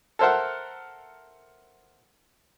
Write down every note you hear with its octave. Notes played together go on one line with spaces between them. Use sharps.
A4 A#4 C5 E5 F#5